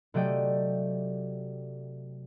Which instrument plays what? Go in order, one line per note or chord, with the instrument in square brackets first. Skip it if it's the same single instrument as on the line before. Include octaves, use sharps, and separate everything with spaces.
[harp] C3 F#3 A3 D5 D#5 G5